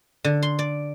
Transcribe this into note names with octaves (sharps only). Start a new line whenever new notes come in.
D3
C6
D5